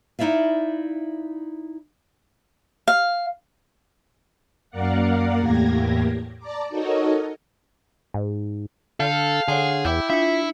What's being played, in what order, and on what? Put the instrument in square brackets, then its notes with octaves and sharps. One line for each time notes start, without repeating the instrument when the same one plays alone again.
[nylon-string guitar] D#4 E4 D5 E5 F5
[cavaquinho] F5
[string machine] F#2 A#3 A#4 D5 F5 F#5
E2 A2 A#3 G4 G#6 A#6
D5 A5 A#5 D6
D#4 F#4 A4 A#4 C#5 D#5
[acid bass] G#2
[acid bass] D3 [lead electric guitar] A4 [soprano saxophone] F5 [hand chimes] A5 F6 G6
[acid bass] D3 [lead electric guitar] G#4 [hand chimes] C#5 F#5 C6
[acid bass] E2 [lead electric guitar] E4 [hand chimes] G5 D6 G6
[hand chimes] D4 C#7 [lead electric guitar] E4 [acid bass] F4 [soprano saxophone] E5